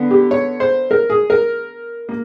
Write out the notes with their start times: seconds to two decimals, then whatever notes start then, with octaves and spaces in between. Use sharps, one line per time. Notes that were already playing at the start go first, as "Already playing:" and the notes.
Already playing: D3 B3
0.11 G4
0.31 C#5
0.60 C5
0.91 A#4
1.10 G#4
1.30 A#4
2.09 A#3